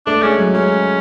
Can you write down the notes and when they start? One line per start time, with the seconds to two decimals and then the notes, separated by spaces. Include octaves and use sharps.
0.06 A3 D4
0.22 G#3 C#4
0.39 F#3
0.54 G#3 C#4